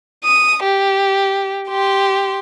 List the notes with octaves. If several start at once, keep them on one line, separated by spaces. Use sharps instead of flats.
D#6
G4
G4 C6